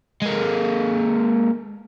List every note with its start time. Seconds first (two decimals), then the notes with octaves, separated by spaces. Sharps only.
0.22 G#3 A#3